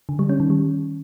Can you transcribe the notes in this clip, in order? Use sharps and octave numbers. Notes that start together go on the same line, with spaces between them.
D3
G3
C#4
D#3
G3